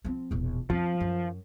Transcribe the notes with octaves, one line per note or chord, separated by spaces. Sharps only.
F3 C4
E1 A#1
F2 F3
F#2